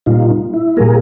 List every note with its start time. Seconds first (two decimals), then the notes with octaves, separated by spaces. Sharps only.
0.06 A#2 G3 A#3 D#4 F4
0.54 E4
0.77 A#2 G3 A#3 G#4 A#4